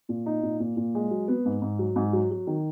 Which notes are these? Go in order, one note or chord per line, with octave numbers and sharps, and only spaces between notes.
A#2
D#4
A#2
A#2
A#2
G#3
F#3
B3
G#2
G#2
F#3
G#2
F#3
F#3
D#3